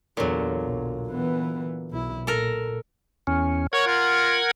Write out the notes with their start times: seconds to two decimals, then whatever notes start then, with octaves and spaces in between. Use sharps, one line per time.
0.17 E2 A#2 D3 F#3
0.61 B1
1.11 E3 B3
1.90 B1 E4
2.27 A#2 A4 A#4
3.27 E2 C#4
3.73 A#4 C#5 F#5 G#6
3.87 F4